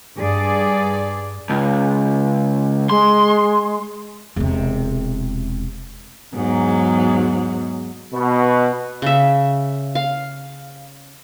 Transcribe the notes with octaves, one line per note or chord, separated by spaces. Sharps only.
G2 G#4 D5
C#2
G#3 C6
E1 C3
E2 G#2 F#3
B2
C#3 E5
F5